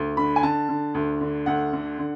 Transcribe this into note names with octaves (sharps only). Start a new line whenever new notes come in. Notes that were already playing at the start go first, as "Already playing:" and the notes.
Already playing: D2
D3 B5
G#5
D3 A5
D3
D2
D3
D2 F#5
D3
D3